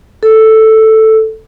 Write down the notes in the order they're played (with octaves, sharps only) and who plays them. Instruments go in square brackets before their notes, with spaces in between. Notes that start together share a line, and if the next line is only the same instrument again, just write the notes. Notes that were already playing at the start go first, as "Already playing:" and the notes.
[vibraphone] A4